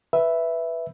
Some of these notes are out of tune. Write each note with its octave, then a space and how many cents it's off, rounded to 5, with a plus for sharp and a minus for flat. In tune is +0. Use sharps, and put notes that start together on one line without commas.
B4 +0 E5 +0